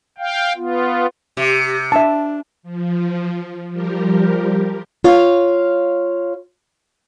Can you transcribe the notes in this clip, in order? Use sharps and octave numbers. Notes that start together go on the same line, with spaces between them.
F5 G5
B3 F4
C3 G4
D4 E5 A5
F3
F3 G3 G4 A#4
F4 C#5 F5